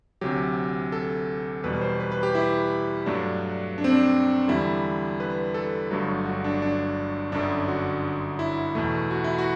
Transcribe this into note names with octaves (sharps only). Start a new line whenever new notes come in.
D2 C3 F#3 G4
A4
E2 B2 G3 B4
C5
B4
B4
G4
E4
G2 F#3 A3 D4
D4
C4
D4
E2 D3 G3 E4
B4
A4
G1 G2 F#3 A3
F#4
D4
D4
G1 F#2 D3 D4
F#4
E4
E2 B2 A3
F#4
E4
F#4